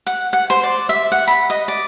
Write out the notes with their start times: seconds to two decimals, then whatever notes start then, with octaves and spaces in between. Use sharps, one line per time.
0.07 F#5
0.33 F#5
0.50 C5
0.63 D5
0.89 E5
1.12 F#5
1.27 B5
1.50 D#5
1.68 D5